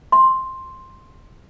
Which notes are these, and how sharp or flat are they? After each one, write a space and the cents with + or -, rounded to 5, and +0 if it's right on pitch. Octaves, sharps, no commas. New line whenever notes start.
C6 +5